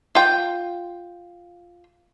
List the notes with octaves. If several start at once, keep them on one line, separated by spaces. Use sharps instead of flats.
F4 G5